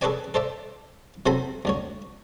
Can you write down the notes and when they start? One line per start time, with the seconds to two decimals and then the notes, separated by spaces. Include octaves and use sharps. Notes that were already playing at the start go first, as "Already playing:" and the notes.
0.01 G#4 A4 B4 C#5 D5 G#5
0.34 A4 C5 D5 E5
1.26 C3 F#3 A4 C5 G#5 B5
1.65 D2 D3 C#5